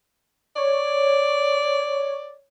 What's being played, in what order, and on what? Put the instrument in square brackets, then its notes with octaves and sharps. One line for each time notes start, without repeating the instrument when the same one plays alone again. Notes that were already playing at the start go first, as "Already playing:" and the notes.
[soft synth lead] C#5 [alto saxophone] D5